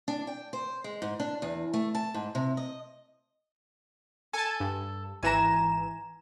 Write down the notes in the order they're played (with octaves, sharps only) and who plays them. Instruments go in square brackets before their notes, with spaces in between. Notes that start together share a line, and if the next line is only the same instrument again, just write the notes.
[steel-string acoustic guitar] D4
G5
C5
G#3
G#2
D4
E2
A3
A5
G#2
C3
D#5
[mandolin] A4 [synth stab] G#5 A5
[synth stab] G2
[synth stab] G#1 E3 E7 [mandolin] G#5 A#5